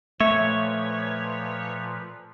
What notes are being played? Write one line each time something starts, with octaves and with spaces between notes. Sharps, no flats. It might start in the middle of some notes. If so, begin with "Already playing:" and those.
A#2 F3 A3 B4 C#5 E5